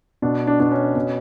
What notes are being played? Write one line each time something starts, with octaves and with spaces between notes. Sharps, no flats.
B2 D4
D4
B2 D4
C#4
B2